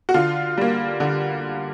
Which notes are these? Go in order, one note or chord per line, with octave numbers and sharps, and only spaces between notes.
F#4
D3 F4
G3 A#3
D3